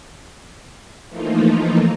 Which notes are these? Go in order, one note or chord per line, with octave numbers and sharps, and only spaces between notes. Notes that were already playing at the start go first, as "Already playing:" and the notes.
E3 F3 A3 A#3 D#4 F4